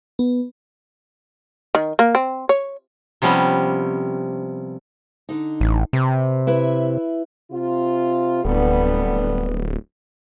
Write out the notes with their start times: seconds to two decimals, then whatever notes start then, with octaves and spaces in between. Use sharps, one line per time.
0.19 B3
1.75 D#3
1.99 A#3
2.15 C4
2.49 C#5
3.22 C3 F3 G3 B3 C#4
5.29 D3 D#4
5.60 A1
5.93 C3 B4
6.47 E4 B4 E5
7.51 C3 F4
8.45 D1 D3 G3 B3